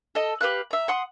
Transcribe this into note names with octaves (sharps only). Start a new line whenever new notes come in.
A4 D#5
G4 B4 F5 F#6
E5 A#5
F#5 C6 D#6